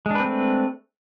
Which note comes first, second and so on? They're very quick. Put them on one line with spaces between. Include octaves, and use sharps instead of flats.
G#3 D4 B4 C4 A3